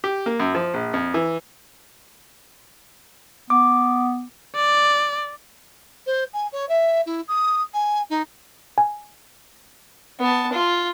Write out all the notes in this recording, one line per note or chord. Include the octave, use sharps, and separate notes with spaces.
G4
A#3
F#2
F3
A#1
F2
E3
B3 D6
D5
C5
G#5
C#5
E5
E4
D#6
G#5
D#4
G#5
B3 A5
F4